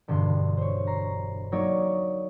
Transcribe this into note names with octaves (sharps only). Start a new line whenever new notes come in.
E1 G2 D3 C6
C5 C#5
A#5 C7
F#3 A#3 D#4 C#5 D5